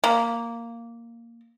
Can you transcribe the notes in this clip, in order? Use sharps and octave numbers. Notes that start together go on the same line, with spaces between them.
A#3